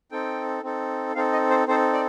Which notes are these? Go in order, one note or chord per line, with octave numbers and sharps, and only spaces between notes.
C4 D#4 A4 G5
C4 D#4 A4
C4 D#4 A4 F5
D#5
C5
C4 D#4 A4 C5
D5